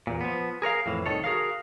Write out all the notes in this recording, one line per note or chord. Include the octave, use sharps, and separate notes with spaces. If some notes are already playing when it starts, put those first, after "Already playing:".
E2 A#2
F3 B3
G#4 A#4 C#5 F5
F2 A2 E3
C2 D#3 A4 C#5
F#4 G#4 A#4 F5